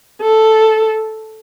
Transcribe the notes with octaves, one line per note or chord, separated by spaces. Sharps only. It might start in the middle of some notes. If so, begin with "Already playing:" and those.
A4